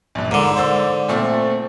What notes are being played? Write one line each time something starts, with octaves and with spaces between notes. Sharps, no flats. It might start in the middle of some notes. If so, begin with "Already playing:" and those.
A#1 G2
G#2 D3 A#4
C5 D5 E6
A#2 A3 C4